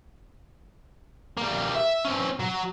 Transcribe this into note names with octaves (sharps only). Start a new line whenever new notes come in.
G3 A#3
E5
C4 C#4
F#3